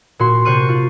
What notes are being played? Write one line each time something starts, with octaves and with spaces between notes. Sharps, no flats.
A#2 F#4 C6
C3 C5 C#6 F#6 D#7
F4